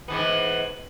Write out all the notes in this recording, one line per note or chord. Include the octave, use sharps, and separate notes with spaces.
G#2 E3 B3